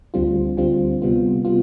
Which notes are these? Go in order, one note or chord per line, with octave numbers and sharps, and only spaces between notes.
D2 D3 G3 C4 F4
D2 D3 G3 C4 F4
C3 G3 B3 F4
C3 G3 B3 F4